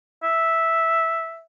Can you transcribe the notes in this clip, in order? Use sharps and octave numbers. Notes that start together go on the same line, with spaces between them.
E5